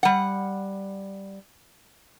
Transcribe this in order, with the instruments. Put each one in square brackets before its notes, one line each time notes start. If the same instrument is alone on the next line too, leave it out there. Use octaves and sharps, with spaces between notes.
[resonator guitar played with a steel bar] G3 F#5